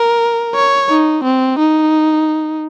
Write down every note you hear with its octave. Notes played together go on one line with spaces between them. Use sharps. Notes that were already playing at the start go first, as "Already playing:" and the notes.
Already playing: A#4
C#5
D#4
C4
D#4